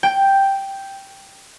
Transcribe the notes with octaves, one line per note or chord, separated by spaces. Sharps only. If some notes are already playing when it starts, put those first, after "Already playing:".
G5